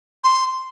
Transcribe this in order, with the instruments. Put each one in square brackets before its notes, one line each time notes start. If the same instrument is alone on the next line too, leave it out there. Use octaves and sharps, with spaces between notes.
[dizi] C6